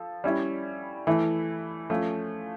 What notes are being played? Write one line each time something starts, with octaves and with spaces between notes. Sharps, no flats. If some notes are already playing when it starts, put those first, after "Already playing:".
Already playing: F3 A4
G3 C#4 E4
E3 A3 E4
F3 A3 C#4